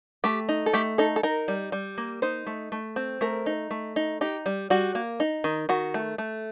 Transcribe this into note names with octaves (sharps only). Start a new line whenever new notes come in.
A3 G4
D#4
A4
A3 G4
D#4 A4
A4
D#4 A#4
G3
G3
A#3
D#4 C5
A3
A3
C4
A3 A#4
D#4
A3
D#4
D#4 G4
G3
G3 F#4
A#3
D#4
D#3
D#3 F#4
A3
A3